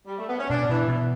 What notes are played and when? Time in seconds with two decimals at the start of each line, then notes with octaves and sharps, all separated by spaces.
0.07 G3
0.19 A3
0.29 B3
0.39 C#4
0.50 B2 D4
0.69 B2 E3
0.88 B2 E3